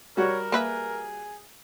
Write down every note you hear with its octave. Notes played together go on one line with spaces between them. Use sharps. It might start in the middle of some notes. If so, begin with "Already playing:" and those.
G3 F#4 A#4 C#5
A#3 G#4 B4 E5